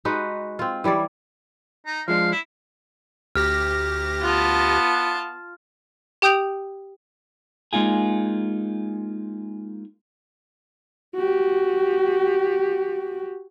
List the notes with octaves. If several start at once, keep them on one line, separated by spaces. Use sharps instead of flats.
G#3 D#4 F#4 B4
C4 F4
E3 G3 C#5 D5
D#4
F3 G#3 D4 F5
E4
D2 G4 F6 A#6
B3 F4 A5
G4 G5 D#6 G6 D7 F7
G#3 A#3 D#4 F4 G#4
F#4 G4